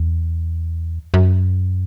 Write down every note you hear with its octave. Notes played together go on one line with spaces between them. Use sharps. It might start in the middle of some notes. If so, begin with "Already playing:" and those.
Already playing: E2
F#2